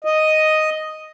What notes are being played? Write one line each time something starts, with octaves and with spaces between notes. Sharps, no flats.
D#5